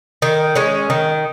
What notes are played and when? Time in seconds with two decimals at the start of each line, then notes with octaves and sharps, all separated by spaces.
0.22 D#3
0.55 G#3 C#4
0.90 D#3